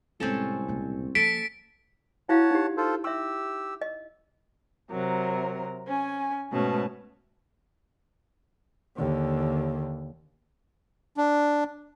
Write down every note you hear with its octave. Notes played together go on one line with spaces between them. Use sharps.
C2 A2 G#3 C4 C#4 A4
C#2 A#2
F3 A#3 A4 C#6 B6 D7
E4 F#4 C#5 F5 F#5 A5
D#4 G4
F4 A4 C5
G4 E5 C6 E6
D#5
C3 F#3 A#4
C#4 G#5
G#2 B2 A3 C#4 B4 A5
D#2 D3
D4